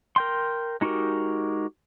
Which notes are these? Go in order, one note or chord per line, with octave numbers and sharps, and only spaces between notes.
A#4 G5 C6
G#3 D#4 F#4 G4 A#4